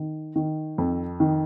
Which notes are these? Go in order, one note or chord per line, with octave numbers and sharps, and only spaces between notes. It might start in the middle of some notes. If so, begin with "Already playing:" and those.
Already playing: D#3
D#3
F2
D#3